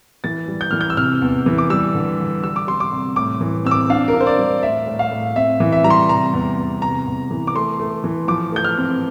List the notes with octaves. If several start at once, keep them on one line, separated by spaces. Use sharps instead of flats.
E3 A6
G3
G6
E3 F6
G6
E6
C3 F6
E2
E3
D6
G3 E6
D3
D3
G3 E6
D6
G3 C6
D6
C3
A2 D6
E3
C4 E6
D6
D4 F5
A#4
D4
C5
D5
G3
A2 E5
A2
F5
A2
C4 E5
E3
E5
G3 A#5
C6
C3 A#5
E2
E2
C3 A#5
E2
E3
D6
A3 C6
A3
E3
F3 D6
A3 G6
F6
C4